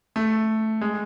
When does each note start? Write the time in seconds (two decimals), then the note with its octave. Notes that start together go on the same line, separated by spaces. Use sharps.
0.16 A3
0.81 G#3